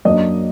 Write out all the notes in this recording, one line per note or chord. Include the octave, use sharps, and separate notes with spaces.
F#2 F#3 A#3 D4 D#5